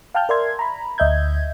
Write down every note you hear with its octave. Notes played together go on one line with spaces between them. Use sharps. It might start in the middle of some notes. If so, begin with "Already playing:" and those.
F5 G5 A5 F6 G6
A#4 D5 E5 C6 G#6
A#5 B5
D2 D#5 E5 G6 G#6